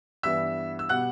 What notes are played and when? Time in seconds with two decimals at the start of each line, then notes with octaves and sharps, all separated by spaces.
0.23 G2 E3 G3 B3 D4 E5 E6
0.79 E6
0.89 B2 G3 F#5 F#6